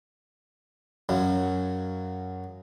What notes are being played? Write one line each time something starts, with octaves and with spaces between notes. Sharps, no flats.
F#2 C#3 F#3